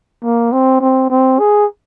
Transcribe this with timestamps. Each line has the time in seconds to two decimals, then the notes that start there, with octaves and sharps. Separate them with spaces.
0.24 A#3
0.52 C4
0.81 C4
1.10 C4
1.39 G#4